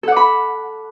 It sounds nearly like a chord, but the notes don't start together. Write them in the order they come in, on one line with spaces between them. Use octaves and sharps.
A4 F#5 D6 B5